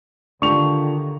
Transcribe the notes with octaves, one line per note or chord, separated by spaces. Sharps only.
D3 D#3 D4 F4 G4 C#6 F7